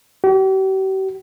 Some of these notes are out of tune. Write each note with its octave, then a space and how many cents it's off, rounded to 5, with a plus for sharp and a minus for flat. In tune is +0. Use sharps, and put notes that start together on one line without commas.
G4 -45